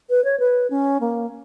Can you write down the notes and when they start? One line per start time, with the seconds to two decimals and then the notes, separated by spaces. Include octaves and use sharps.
0.10 B4
0.24 C#5
0.40 B4
0.70 C#4
1.01 A#3